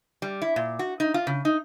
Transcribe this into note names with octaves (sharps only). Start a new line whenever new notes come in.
G3
E4
A#2
F#4
D#4
F4
C#3
D#4